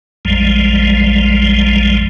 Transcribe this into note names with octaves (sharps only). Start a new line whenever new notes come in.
A#1 F2 F3 G3 G#3